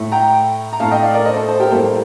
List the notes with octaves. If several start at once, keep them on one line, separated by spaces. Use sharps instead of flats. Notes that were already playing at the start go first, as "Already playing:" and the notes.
Already playing: A2 A3
G5 A#5
A#5
A2 A3 F5 A5
D#5 G5
D5 F5
A#4 D5
C5 D#5
A4 C5
A4 C5
G4 A#4
A2 G3 A#3 A4 C5